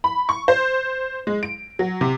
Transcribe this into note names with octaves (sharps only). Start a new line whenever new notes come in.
B5
C#6
C5
G#3
D7
F#3
C3